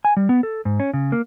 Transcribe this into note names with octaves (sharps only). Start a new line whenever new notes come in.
G#5
G3
B3
A4
G#2
C#4
C#3
A#3